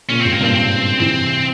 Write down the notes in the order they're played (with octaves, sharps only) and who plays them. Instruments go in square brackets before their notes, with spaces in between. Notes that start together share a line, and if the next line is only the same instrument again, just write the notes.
[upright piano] A#2 C#3 [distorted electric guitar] C#4
[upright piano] G#2 C3 [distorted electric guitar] C4
[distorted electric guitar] A#3
[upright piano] G2 A#2 [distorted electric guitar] C4
[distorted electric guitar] C4
[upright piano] C3 E3 [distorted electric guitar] C4